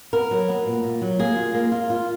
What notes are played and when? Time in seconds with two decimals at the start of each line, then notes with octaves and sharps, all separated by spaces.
0.13 B3 A#4
0.31 F#3
0.49 B3
0.66 A#2
0.83 A#2
1.02 F#3
1.19 A#3 G#4
1.37 F4
1.54 A#3
1.72 F4
1.90 F4